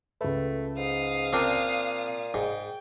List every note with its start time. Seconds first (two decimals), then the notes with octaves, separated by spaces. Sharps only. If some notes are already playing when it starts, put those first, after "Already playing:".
0.21 C#2 A3 B4
0.77 G#2 F5 D#6
1.33 A#2 C4 D4 A#4
2.34 G#2 G#4 G5